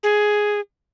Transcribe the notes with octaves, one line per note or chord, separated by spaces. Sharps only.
G#4